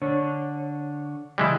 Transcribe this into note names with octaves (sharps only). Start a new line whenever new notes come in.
D3 D4 C#5
C#3 E3 G3 G#3 E4